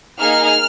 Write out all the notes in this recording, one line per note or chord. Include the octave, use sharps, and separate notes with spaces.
A#3 D#4 G#4 F6